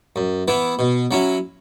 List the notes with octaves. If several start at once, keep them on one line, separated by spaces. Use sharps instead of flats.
F#2
E3 B3 E4
B2
F#3 C#4 E4